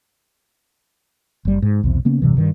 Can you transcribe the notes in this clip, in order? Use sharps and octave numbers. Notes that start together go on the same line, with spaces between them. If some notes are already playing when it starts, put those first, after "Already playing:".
F#1 G3
G#2
B1 E2 C3
C#3 A#3 B3 C#4
E1 G2 C3 E3
G2 D#3